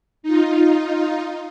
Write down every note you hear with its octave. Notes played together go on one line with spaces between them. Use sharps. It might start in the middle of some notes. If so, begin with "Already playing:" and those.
D#4 F4